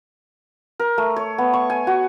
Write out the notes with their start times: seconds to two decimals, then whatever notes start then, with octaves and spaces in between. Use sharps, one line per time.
0.80 A#4
0.98 A3
1.16 C#5
1.38 B3
1.53 C#6
1.70 G#5
1.87 F#4